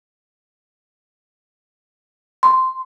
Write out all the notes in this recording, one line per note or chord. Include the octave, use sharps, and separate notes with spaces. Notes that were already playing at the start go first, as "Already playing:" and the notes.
C6